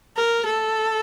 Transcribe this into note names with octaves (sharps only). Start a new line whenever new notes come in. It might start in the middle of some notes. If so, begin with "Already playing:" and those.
A#4
A4